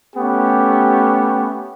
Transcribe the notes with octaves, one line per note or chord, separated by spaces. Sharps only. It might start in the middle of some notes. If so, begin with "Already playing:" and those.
A3 B3 C#4 G4